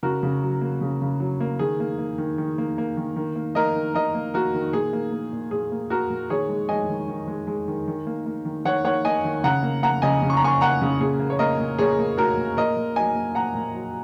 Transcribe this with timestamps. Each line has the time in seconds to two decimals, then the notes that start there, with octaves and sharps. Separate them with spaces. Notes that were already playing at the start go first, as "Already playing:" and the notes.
0.03 C#3 F#4 A#4
0.23 C#3
0.43 F#3
0.61 A#3
0.81 C#3
1.02 C#3
1.20 F#3
1.40 A#3
1.59 D#3 G#4
1.80 A#3
1.98 A#3
2.18 D#3
2.38 D#3
2.58 A#3
2.78 A#3
2.97 D#3
3.16 D#3
3.36 A#3
3.55 A#3 A#4 D#5
3.75 D#3
3.94 D#3 A#4 D#5
4.14 A#3
4.34 A#3 F#4 A#4
4.54 D#3
4.73 A#2 G#4
4.93 A#3
5.12 A#3
5.33 A#2
5.51 A#2 G#4
5.72 A#3
5.90 A#3 F#4 A#4
6.10 A#2
6.30 D#3 G#4 C#5
6.49 G#3
6.69 G#3 D#5 G#5
6.89 D#3
7.08 D#3
7.28 G#3
7.47 G#3
7.68 D#3
7.88 D#3
8.07 A#3
8.26 A#3
8.45 D#3
8.65 D#3 C#5 F#5
8.84 A#3 C#5 F#5
9.05 A#3 D#5 G#5
9.25 D#3
9.44 C#3 F#5 A#5
9.63 A#3
9.83 A#3 F#5 A#5
10.02 C#3 D#5 G#5
10.22 C#3
10.30 C#6
10.37 A#5
10.42 A#3 G#5 C#6
10.61 A#3 F#5 A#5
10.81 C#3
11.00 A#2 G#4
11.19 A#3
11.30 C#5
11.39 A#3 A#4 D#5
11.60 A#2
11.79 A#2 G#4 C#5
11.99 A#3
12.17 A#3 F#4 A#4
12.37 A#2
12.57 A#2 A#4 D#5
12.77 A#2
12.96 F#3 D#5 G#5
13.15 A#3
13.35 A#2 F#5 A#5
13.55 A#2
13.74 F#3